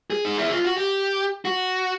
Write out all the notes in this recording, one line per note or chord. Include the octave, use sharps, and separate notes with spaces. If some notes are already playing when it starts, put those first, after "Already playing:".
G#4
D#4
E4
F4
F#4
G4
F#4